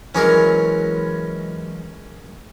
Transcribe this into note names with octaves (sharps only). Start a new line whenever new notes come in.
E3 F#3 G#3 C#4 G#4 A#4